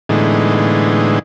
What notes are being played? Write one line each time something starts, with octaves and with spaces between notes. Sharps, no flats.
A2 D3 E3 G#3 B3 D#4